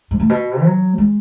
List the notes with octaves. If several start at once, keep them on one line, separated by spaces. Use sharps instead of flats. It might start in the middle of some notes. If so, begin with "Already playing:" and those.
G#2
A2
B2
F#3
G#3